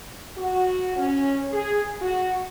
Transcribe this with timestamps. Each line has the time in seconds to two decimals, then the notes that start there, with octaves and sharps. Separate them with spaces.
0.37 F#4
0.97 C#4
1.51 G#4
2.01 F#4